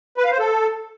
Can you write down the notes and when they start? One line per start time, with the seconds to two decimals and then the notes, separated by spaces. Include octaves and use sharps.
0.17 B4
0.25 F5
0.32 C5
0.39 A4